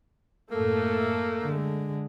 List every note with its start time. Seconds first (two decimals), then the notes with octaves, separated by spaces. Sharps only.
0.51 F#2 A2 A3 A#3
1.42 D3 G#3